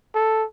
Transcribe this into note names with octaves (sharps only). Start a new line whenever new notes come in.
A4